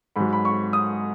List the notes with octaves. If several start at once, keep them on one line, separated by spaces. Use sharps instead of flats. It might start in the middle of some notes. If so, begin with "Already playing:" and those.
G#2 F#3 B5
B5
C#6
D#6